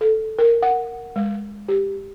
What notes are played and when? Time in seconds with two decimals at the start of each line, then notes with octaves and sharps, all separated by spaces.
0.01 A4
0.39 A#4
0.63 F#5
1.16 G#3
1.68 G4